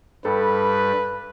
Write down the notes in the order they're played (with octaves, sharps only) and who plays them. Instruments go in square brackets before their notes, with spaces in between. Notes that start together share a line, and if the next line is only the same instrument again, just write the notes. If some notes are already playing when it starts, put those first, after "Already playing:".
[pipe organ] G2 G3 [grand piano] A4 [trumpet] B4